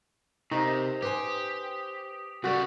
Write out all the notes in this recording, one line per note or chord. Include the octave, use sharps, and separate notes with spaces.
C3 D#4 G4 A#4 C5
G4 B4 C5 G5 G#5 D#6
C#3 G3 F#4 A4 A#4 D5